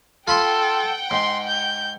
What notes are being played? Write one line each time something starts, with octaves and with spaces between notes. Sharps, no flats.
F4 A4 F#5 G5 B5 C6
G#2 C6
G6